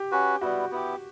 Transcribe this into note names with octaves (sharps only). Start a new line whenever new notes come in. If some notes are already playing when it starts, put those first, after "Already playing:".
Already playing: G4
C#4 F#4 B4
G3 B3 E4 F#4
B3 E4 G4